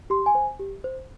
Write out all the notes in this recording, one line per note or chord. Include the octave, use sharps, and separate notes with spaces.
G4 C6
G#5
C5
G4
C5